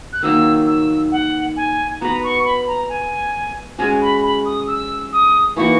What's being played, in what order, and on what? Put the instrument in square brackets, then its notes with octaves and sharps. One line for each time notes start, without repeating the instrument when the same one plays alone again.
[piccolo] F#6
[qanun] D#3 F#3 A#3 D#4 [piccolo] E6
[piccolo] E6
F#5
G#5
[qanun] B3 F#4 B4 [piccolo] A#5
[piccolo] C#6
B5
A#5
G#5
[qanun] G#3 C#4 F#4 [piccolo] G#5
[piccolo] B5
B5
D#6
E6
D#6
[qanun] E3 A#3 D#4 F#4 [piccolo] C#6